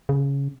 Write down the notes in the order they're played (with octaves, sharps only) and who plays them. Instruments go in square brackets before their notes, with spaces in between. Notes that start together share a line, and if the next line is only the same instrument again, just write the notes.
[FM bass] C#3